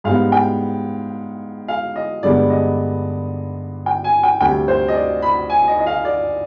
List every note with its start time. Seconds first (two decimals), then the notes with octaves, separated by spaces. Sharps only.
0.04 G#2 G3 B3 F5
0.32 G5
1.68 F5
1.96 D#5
2.23 G2 D3 G#3 B3 D5
2.50 D#5
3.86 G5
4.04 G#5
4.23 G5
4.41 D2 C3 G3 G5
4.68 C5
4.88 D#5
4.95 D5
5.22 B5
5.50 G#5
5.68 D#5
5.79 D#5
5.86 F5
6.05 D5